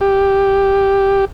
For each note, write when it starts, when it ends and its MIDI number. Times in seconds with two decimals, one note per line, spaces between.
0.01 1.25 67